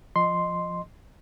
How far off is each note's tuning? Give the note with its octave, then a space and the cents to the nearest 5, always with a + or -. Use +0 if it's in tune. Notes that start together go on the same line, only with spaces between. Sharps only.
F3 +0 D#5 -10 C6 +0